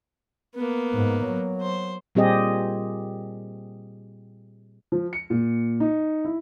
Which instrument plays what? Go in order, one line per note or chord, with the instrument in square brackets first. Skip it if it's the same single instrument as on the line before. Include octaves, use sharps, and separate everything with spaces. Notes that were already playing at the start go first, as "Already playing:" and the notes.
[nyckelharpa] A#3 B3
[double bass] G#2
F#3
[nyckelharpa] C5
[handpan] A#2 G3 C4 G4 G#4 D#5
[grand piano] F3
C#7
A#2
D#4
E4